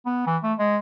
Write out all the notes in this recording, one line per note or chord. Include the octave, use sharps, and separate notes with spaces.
B3
E3
A3
G#3